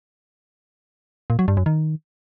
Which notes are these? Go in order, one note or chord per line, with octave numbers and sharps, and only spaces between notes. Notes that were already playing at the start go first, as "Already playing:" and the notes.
A#2
F#3
G2
F#2
D#3